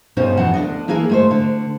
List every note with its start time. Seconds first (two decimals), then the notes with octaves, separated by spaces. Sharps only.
0.17 D2 G2 B2 C#4 D#4 C5
0.37 F2 E3 F#5 A5
0.54 D2 A#2 D4 D#5
0.88 E3 A#3 E4 G#4 A#4
1.09 G#3 A3 C5
1.31 D3